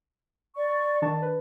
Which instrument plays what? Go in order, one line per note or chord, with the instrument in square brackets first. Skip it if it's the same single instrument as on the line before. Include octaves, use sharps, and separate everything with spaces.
[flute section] D5 C#6
[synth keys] D#3 D4 A5
B4